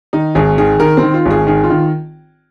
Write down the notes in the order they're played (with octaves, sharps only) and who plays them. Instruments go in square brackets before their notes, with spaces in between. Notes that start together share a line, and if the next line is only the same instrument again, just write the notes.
[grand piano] D#3 D#4
G#1 G#4
D#3 G#4
D#3 A#4
C4
D#3
F4
G#1 G#4
D#3 G#4
F4
D#3